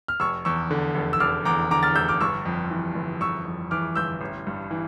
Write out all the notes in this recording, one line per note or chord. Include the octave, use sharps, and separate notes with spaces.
F6
F1 C#6 E6
E2 C#6 E6
D3
F1
E6
F1 D6 F6
E2 A#5 D6
D3 A#5 D6
F6 A6
F1 E6 G6
D6 F6
G1 C#6 E6
F2
E3
G1
G1 C#6 E6
F2
E3 D6 F6
G1 E6 G6
A1
G2
E3